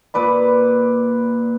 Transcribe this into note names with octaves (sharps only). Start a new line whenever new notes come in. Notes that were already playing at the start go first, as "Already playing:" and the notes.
A#2 B4 D5 B5